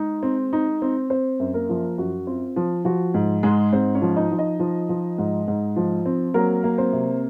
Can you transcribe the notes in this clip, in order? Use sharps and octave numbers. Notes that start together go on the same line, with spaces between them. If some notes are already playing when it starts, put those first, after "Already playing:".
Already playing: G#3 D#4
C4
D#4
C4
C4 C5
F#2
A#3 A#4
F3
F#2 F#4
C4 F4
F3
F3 F#4
G#2
G#2 G#3 G#4
G#2 C4 C5
C#4 C#5
F3
D#4 D#5
F3
D#4 D#5
F3
F3
G#2
G#2
F3
C4
F#3 A#3 A#4
A#3
C4 C5
C3